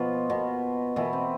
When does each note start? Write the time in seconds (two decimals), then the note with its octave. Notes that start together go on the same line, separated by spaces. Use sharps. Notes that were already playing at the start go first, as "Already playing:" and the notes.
Already playing: B2 F3 F4
0.30 B2
0.96 B2 E3 E4
1.13 C4